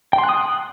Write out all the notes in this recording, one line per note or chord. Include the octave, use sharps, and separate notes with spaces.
G5
C6
F#6
D#6
F#6